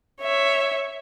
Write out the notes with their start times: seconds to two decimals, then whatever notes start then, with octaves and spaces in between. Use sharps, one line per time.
0.21 C#5 E5